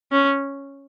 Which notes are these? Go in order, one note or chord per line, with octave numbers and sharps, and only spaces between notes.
C#4